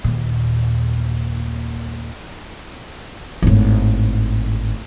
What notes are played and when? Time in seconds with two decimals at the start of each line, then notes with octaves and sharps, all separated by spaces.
0.04 D#2 A#2
3.42 G#1 A2